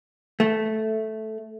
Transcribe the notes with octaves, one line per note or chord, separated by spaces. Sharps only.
A3